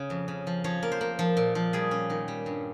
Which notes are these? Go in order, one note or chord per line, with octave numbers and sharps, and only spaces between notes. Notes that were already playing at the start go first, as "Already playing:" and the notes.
Already playing: C#3
F2
C#3
F3
F3 C#5
A#3
C5
A#3
F3
A#2
F3
G3 G#4
C#4
D#3
G3
G2